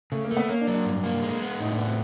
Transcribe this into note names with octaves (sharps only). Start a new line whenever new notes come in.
C#3 A3
A#3
A3
B3
A#3 C#4
D4
F#3
D4
G2
A#3
G#3
B3
A2 D#4
D4
B3
C4